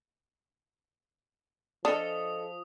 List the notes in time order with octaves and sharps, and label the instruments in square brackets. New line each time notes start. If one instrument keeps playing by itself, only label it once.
[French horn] F3 [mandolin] C#4 A4 D#5 [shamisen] D4 [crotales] D#6